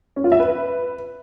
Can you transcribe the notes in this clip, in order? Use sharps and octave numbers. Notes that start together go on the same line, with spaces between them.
C#4
F4
E5
B4